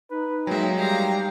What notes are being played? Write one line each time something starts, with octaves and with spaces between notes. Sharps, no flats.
D#4 B4
F#3 G#3 A#3 E5 G5
G3 F5 A#5